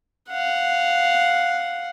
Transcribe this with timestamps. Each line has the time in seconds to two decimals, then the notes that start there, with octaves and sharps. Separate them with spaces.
0.30 F5 F#5